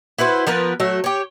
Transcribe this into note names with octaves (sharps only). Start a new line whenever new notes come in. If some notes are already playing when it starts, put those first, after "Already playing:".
E4 F#4 B4 C5
F3 B3 A#4 B4
F#3 A3 E5
G4 C#5